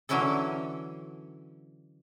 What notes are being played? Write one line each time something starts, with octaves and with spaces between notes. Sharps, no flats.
D3 E3 F#3 C#4 E4 A4